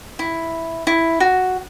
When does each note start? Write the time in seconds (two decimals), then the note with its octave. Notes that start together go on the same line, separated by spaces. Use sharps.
0.19 E4
0.87 E4
1.20 F#4